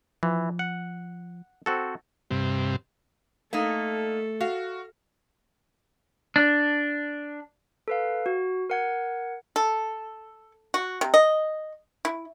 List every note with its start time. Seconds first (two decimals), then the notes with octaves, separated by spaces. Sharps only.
0.23 E3 F3
0.59 F#5
1.66 C4 F#4 A4
2.31 G2 C3
3.53 A3 A#3 D#4 A4
4.41 F#4 F5
6.36 D4
7.88 A4 B4 F5
8.26 F#4
8.70 A#4 F#5 G#6
9.56 A4
10.74 F#4
11.01 C3
11.14 D#5
12.05 E4